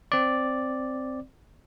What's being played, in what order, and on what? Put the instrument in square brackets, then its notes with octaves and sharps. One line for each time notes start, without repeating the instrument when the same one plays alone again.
[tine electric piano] C4 D5